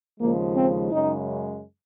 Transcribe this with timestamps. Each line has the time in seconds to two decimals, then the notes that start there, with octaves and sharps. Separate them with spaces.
0.21 D#2 C#3 F3 G#3 A#3
0.56 C4
0.91 F#2 C#3 G#3 D#4